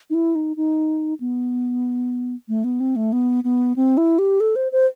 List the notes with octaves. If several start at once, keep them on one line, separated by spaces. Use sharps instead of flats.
D#4
E4
D#4
D#4
B3
A3
B3
C4
A3
B3
B3
C4
E4
G4
A4
C5
C5